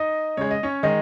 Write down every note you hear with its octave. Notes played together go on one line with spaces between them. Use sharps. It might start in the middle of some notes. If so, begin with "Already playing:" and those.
Already playing: D#4 D#5
C#3 G#3 C#5
D#5
C#4 C#5
D#3 G#3 D#4 D#5